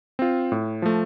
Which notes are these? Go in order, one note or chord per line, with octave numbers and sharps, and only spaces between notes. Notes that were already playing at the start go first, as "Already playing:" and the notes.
C4 F4
A2
F3 A3